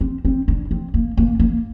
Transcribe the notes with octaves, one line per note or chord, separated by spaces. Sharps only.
C4
C4
D4
C4
A#3
A#3
A#3